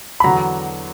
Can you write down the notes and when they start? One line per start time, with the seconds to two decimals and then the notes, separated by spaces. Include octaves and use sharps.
0.20 B5
0.24 E2 D3 F#3 A#5